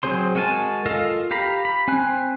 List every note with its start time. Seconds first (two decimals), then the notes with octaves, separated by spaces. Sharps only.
0.03 F#3 C4 G#4 C5 C6
0.35 G#3 F#4 A#4 G#5 A5
0.86 F4 A4 A#4 D#5 F5
1.31 G4 F5 A#5 B5
1.65 B5
1.88 C4 G#5 F#6